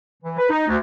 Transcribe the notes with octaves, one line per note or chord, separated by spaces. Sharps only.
E3
B4
D#4
D2